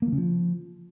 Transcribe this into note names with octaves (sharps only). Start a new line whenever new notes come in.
A#3
E3
C#3
F3